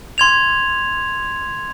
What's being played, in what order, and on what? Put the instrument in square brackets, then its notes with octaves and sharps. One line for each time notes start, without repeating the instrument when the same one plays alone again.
[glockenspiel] C6 G#6 F7